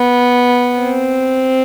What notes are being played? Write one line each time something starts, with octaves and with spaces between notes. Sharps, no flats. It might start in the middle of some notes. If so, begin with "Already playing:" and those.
Already playing: B3
C4